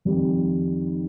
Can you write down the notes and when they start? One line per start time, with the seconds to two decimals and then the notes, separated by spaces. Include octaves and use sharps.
0.05 F2 D#3 G3